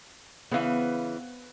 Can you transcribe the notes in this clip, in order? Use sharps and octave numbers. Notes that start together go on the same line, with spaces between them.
C#3 E3 B3 C5 F5